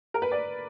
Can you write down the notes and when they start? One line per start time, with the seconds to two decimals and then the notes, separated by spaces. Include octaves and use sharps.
0.14 A#4
0.22 B4
0.32 D5